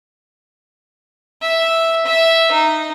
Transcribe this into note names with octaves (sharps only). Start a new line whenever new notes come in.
E5
E5
D#4